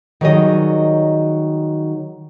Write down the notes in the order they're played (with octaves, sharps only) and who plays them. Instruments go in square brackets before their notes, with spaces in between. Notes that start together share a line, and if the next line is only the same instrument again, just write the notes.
[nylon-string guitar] D#3 F#3 G3 G#4 D#5